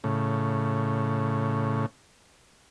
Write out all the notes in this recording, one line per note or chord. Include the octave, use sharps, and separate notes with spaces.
A2 C#3